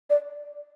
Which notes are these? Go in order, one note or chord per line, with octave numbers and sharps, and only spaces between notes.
D5